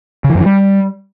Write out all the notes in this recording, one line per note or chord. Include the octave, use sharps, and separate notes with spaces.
C#3
E3
F#2
E3
G3